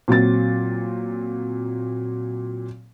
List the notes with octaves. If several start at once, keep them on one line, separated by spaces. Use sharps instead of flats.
A#2 F#3 C4 A6